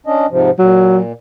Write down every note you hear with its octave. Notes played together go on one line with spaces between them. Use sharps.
C#4 D4 D#5
G#2 C3 F3
A#2 F#3